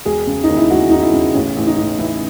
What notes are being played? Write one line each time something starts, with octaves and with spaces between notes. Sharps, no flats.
E1 G#4
C#3
D#4
D#2
E4
E1 F#4
C#3 D#4
E4
C#3
A1 C#4
A1
D#4
A1
E3 E4